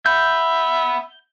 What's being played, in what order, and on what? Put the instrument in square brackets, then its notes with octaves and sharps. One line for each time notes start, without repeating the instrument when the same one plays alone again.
[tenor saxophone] E5 [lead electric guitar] F#5 B5 [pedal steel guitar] G6